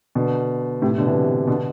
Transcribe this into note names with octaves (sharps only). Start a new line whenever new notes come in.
B2 D3
A2 C3
B2 D3
C3 E3
B2 D3